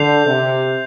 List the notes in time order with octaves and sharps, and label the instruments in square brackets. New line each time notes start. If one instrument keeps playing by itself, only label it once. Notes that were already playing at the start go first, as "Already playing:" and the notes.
Already playing: [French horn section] D3 [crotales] G6 C7 F7
[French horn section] C3